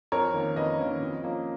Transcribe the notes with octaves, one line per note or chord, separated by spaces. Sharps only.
F2 A#4 C#5
D#3 A#3 C#4
F2 B4 D#5
D#3 A#3 C#4
F2
F3 A#3 C#4